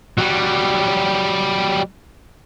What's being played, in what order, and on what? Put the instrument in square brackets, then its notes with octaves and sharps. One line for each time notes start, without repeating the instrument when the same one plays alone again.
[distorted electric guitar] F#3 G3